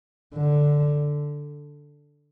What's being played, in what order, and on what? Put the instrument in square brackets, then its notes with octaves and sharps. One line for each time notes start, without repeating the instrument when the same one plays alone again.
[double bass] D3